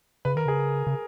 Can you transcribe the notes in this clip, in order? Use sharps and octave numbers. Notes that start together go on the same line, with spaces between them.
C#3 B4
D#3 A#4
C#3 G#4
C#3